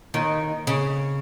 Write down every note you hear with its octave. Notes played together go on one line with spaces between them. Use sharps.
D#2 D#3
C#3